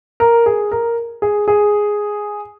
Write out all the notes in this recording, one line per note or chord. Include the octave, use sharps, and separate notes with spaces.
A#4
G#4
A#4
G#4
G#4